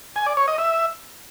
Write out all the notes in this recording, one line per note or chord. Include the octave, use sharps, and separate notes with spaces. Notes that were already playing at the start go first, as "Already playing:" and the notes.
G#5
D5
C#5
D#5
E5